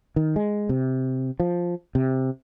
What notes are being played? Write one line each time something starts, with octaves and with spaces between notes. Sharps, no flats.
D#3
G#3
C3
F3
C3